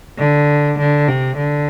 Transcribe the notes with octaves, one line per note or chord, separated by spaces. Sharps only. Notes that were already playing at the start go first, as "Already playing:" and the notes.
D3
D3
C3
D3